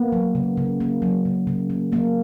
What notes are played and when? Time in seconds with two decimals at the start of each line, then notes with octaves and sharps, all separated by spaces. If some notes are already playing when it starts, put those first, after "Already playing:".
Already playing: A#3 B3
0.12 F#3
0.35 C#3
0.57 C#3
0.80 A#3
1.02 F#3
1.25 C#3
1.47 C#3
1.70 A#3
1.92 F#3 A#3